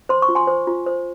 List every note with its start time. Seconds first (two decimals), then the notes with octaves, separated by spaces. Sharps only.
0.09 C5 C6
0.22 C#6
0.29 F4
0.35 G#5 C6
0.47 C5
0.67 F4
0.86 C5